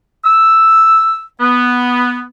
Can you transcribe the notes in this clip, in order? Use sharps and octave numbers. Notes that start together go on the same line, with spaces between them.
E6
B3